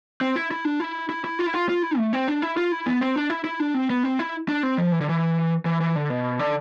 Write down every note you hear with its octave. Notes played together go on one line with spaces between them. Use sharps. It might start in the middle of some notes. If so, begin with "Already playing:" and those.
C4
E4
E4
D4
E4
E4
E4
F4
E4
F4
F4
E4
A3
C4
D4
E4
F4
E4
B3
C4
D4
E4
E4
D4
C4
B3
C4
E4
D4
C4
F3
E3
D3
E3
E3
E3
D3
B2
D3